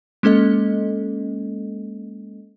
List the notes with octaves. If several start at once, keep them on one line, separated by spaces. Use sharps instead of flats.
G#3 A#3 C#4 A4 D#5